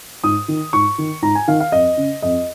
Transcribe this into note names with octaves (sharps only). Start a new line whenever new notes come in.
G#2 D#6
D#3
G#2 C#6
D#3
G#2 A#5
G#5
D#3 F5
F5
F2 D#5
C#3
F2 D#5